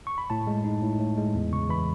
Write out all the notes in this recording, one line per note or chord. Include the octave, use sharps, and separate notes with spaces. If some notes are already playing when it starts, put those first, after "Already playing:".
C#6
B5
A2 A5
G#3
D#4
A2
A2
G#3
E2
C#3 C#6
E3 B5